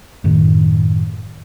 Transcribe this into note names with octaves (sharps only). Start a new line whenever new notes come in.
F#2 A2 D#3